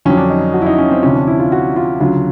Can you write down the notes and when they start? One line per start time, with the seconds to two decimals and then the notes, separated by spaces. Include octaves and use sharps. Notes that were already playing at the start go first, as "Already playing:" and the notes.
0.05 F2 D3 F#3 C#4
0.17 D4
0.30 D#4
0.54 F#4
0.62 E4
0.66 D#4
0.78 C#4
0.91 C4
1.03 D2 C3 F3 C#4
1.15 D4
1.27 E4
1.39 F4
1.52 F#4
1.76 F4
2.00 D2 C#3 F#3 F4